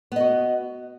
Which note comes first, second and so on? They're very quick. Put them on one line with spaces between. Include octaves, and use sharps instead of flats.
B3 D#5 F#4